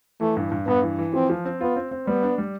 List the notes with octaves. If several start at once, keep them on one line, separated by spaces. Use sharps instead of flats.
E3 A3
G2
G2
G2 B3
E3
E3
F3 C4
F3
C4
B3 F4
C4
C4
G3 B3
D4
G3